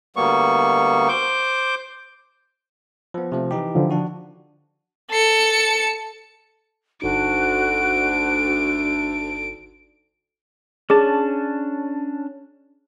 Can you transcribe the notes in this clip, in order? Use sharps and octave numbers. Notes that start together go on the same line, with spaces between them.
D2 G3 A#3 B3 C#6
C5 D6 G6
F3 B3
C3 F3 A3
E3 D#4 G4
D3 F3
D4 F#4
A4 C#7
G1 D2 D4 D#4 F#4 D7
C#4 D4 G#4 A5